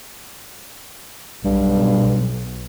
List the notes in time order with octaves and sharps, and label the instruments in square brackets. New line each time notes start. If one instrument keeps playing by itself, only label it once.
[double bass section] B1 [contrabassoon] G2